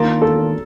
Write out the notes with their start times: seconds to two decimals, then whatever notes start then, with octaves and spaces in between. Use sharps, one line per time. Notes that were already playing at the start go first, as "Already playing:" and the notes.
Already playing: D#3 A#3 D4 F4 A#4
0.21 A4